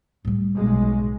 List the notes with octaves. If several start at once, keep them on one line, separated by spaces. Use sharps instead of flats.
A2 G3
B1 G#3